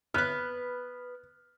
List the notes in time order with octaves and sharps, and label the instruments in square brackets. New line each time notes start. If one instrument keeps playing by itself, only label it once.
[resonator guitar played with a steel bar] B3 B4 [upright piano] F6 F#6